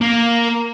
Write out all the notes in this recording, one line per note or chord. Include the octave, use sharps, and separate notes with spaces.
A#3